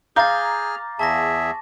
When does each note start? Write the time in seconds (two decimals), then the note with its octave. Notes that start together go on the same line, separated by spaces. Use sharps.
0.16 G#4 F5 A#5 D6 F6 G6 A6
0.99 E2 G#4 E5 A5 C#6 A#6